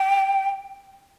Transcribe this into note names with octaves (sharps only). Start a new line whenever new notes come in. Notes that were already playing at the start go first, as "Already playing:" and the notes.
Already playing: G5